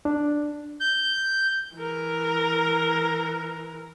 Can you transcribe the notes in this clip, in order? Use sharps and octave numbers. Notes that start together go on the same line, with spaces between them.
D4
G6
E3 A#4